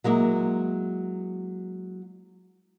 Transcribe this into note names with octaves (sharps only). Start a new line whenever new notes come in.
F#3 G#3 A#3 E4